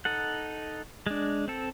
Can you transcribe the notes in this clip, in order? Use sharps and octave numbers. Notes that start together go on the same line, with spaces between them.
D#4 A4 F#5
G#3 D4
C4 A4